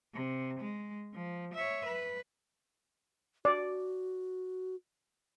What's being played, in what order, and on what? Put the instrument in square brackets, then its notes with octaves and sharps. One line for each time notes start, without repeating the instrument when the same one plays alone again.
[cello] C3
G#3
F3
C#5 E5
B4
[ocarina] F#4 [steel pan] D5